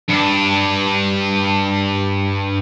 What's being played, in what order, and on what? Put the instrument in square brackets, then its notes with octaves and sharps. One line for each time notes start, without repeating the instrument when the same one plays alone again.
[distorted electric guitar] G2 D4